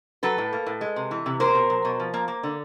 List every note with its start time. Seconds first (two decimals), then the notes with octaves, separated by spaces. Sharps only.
0.23 F#3 A4 B4
0.38 A2
0.53 A#3
0.66 A2
0.81 G#3
0.96 C3
1.11 E3
1.26 C3
1.40 A#3 A#4 C5
1.55 B2
1.70 F#3
1.85 B2
2.00 F3
2.14 A#3
2.28 A#3
2.43 D3